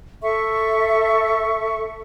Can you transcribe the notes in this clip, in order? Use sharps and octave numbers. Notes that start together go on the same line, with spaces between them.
A4 E5 C#6